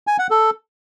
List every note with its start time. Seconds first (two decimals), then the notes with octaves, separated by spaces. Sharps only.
0.07 G#5
0.19 F#5
0.31 A4